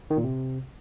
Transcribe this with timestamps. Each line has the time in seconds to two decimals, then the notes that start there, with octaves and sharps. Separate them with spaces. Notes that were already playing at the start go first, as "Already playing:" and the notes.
0.10 D#3
0.17 A#2
0.24 C3